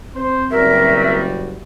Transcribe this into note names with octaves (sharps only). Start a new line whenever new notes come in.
C4 C5
F#1 G3 F#4 A#4 E5